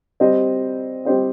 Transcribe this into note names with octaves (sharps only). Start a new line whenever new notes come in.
G3 C4 G4 C5 D#5
G3 C4 G4 C5 D#5